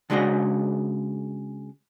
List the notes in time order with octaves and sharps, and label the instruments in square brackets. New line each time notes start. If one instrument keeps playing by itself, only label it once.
[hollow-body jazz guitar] C#3 G#3 D4 F#4 D#5